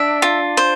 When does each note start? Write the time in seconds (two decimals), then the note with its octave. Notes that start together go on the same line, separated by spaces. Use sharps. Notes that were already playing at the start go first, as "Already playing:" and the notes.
Already playing: D4 E5
0.22 F4
0.57 C5